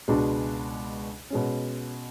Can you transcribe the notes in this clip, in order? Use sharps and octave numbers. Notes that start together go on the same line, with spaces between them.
C#2 B2 G#3 D4 F#4
B2 G#3 C#4